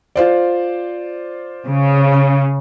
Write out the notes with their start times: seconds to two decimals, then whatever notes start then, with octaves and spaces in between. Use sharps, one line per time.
0.16 F4 C5 D5
1.66 C#3